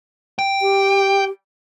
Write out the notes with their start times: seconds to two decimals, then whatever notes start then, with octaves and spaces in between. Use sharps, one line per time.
0.39 G5
0.62 G4